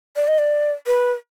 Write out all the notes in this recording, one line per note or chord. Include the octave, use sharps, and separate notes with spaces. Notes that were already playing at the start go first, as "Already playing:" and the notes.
D5
D#5
D5
B4